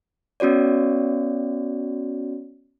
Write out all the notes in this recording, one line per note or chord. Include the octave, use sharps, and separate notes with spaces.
B3 C#4 F#4 C#5 D5